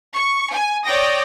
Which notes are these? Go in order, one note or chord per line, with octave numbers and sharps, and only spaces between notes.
C#6
G#5
C#5 D5 G5 D#6 A#6